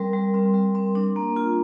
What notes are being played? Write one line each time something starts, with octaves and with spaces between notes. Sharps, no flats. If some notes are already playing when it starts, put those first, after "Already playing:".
Already playing: G3 C4 A#4
G3
C4
G3
C4
D4
A#3
F4